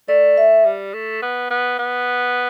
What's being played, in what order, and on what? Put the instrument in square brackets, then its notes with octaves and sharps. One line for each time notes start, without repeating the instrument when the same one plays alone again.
[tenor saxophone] A3 [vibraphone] D5
[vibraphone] E5
[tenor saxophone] G3
A3
B3
B3
B3